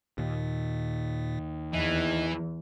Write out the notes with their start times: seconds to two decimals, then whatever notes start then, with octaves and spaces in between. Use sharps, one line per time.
0.18 D#2 A#2
1.73 E2 E3 D#5